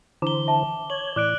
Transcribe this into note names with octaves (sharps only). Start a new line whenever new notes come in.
D3 E3 C5 A#5 D6 G7
E5 A5
C#5 G#6 F#7
A2 E3 D5 D6 F#6 D7